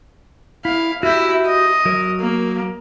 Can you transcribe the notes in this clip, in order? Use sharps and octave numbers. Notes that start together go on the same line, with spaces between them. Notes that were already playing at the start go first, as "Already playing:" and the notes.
E4 F5
E4 F#4 G4
D#5
F#3 A#4
A#3